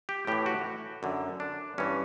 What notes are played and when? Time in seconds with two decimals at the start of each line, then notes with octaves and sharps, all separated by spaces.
0.09 G4
0.27 A2 E3 G4
0.46 F#4
1.03 F#2 D3
1.40 D4
1.78 G2 E3 C#4